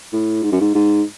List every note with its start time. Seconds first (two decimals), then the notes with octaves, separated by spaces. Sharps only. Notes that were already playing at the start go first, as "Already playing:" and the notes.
0.13 A2
0.43 G#2
0.52 F#2
0.61 G#2
0.75 G#2